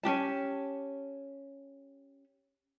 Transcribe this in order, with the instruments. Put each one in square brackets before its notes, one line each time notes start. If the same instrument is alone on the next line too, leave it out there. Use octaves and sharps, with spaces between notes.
[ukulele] C#4 D4 G4 A5